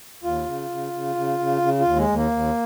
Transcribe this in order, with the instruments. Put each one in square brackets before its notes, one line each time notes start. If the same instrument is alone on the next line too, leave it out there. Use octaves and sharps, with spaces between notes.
[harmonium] D#2 F4
C#3
C#3
C#3
C#3
C#3
C#3
F4
D#2
G#3
D#2
A#3
D#2